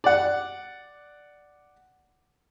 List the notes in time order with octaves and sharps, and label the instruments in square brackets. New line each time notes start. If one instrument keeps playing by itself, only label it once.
[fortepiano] D5 F#5